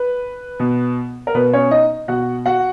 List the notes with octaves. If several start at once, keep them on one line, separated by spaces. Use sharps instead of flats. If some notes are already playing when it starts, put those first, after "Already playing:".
Already playing: B4
B2
A#4
B2 B4
C#4 C#5
D#4 D#5
B2 F#4 F#5
F#4 F#5